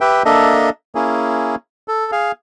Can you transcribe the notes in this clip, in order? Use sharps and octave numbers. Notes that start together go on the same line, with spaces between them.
G4 B4 E5 G5
A#3 D4 A4 D#5 E5
A#3 C#4 E4 G#4
A4
G#4 F5